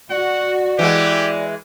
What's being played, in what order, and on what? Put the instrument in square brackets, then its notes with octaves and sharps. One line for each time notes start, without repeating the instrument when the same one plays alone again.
[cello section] F#4 [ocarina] D5 [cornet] F#5
[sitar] E3 G#3 [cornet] G4